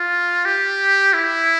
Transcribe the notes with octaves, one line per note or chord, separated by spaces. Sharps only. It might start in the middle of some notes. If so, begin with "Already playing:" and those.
Already playing: F4
G4
E4